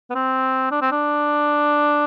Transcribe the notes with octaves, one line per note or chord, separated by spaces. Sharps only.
B3
C4
D4
C4
D4